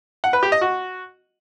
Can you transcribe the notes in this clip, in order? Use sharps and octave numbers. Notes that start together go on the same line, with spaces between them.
F#5
B4
G4
D#5
F#4